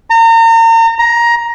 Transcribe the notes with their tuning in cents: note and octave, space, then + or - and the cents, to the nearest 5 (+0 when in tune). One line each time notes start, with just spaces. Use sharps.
A#5 -35
A#5 +15